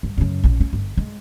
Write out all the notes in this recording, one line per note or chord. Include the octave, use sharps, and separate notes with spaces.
G2
F#2 C#3
A#1 C#4
C#4
G1
G#3